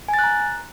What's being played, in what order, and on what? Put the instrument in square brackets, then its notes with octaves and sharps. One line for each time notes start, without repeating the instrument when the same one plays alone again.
[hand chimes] G#5
A6
F#6
A#5